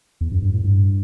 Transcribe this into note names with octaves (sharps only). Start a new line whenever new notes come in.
E2
F#2
G2
A2
G2